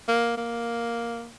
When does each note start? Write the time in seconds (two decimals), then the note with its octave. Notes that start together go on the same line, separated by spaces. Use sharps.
0.08 A#3
0.38 A#3